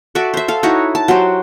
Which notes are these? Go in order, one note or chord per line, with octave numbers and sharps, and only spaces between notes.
F#4 A4 D5 E5
C5 E5
A4 F5
D#4 E4 F#4 C#5
A5
F#3 F#4 G4 C5